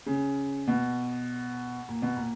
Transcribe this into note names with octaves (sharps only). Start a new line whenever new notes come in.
C#3
B2
A#2
B2
A#2